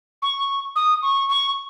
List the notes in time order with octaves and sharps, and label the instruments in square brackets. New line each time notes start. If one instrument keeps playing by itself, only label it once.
[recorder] C#6
D#6
C#6
C#6